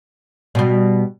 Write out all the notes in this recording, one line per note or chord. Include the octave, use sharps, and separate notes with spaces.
B2 G3